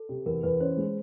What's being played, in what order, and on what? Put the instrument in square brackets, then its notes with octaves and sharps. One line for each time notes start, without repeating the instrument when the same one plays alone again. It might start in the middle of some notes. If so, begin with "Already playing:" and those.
Already playing: [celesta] A4
[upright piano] C3
[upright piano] E2 [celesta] A#4
[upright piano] E2 [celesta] B4
[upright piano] C#4 [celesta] C5
[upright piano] G#3